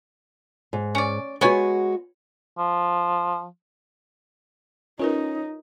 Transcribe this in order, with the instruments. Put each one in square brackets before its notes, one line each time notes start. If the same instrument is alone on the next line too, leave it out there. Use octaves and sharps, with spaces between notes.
[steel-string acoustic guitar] G#2
[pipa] C#4 D5
[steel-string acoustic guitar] G#3 F#4 [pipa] B3 C#5 G#5
[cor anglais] F3
[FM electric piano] C#4 [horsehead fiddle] D#4 [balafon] F4 A#4 B4